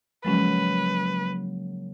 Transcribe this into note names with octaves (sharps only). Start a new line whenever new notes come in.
C#3 F3 F#3 G#3 A#3 C#4 B4